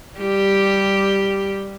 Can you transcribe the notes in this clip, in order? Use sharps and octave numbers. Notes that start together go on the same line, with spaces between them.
G3 G4